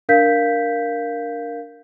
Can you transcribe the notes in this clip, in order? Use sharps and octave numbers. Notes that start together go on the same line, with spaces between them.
D4 A#4 F5 G6 B6